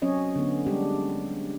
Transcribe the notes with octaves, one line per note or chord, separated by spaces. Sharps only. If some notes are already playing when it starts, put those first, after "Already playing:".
F#3 C4 C#4 C#5 D#5
D3 B3
G3 G#3 D4 G4